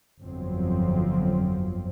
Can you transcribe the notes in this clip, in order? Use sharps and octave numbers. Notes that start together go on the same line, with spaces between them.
G1 F2 F3 F#3 C4